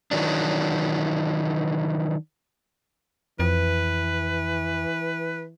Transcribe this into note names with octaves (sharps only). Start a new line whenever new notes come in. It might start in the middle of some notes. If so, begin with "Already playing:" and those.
D#3 E3 F#3 D4
F2 E3 B4